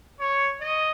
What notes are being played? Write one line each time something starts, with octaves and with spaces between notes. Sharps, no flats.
C#5
D#5